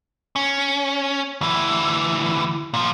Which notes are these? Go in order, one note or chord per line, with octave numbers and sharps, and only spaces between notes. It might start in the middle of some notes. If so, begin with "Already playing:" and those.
C#4
D2 E3
A#2 F3